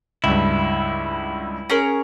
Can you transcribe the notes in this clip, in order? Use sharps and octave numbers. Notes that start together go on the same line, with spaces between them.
C#2 G2 E4
C#4 G#4 A#4